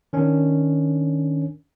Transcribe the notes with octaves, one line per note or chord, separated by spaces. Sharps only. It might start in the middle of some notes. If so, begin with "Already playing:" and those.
D#3 C#4 D4